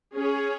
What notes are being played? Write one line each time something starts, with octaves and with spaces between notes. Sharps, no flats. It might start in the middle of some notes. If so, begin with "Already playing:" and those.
C#4 G#4 C#5